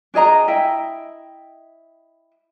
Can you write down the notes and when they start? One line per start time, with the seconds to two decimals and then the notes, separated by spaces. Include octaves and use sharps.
0.14 D4 G#4 D#5 A#5
0.48 E4 D#5 E5 G5